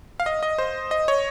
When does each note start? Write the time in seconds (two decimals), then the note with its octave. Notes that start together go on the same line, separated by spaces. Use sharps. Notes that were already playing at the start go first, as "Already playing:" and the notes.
0.20 F5
0.26 D#5
0.43 D#5
0.58 C5
0.91 D#5
1.08 C#5